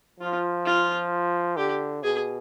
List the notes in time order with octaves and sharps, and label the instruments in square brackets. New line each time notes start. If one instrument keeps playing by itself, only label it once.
[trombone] F3 [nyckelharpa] F4
[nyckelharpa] F4
[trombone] D3 [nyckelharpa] G4
[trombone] B2 [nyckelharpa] G#4